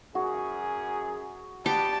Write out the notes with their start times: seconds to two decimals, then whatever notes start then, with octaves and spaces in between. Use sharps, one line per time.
0.15 F#2 F#4 G#4
1.66 B3 D4 G4 A5